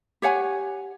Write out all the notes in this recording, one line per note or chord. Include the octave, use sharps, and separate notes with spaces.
G4 C#5 F#5 G#5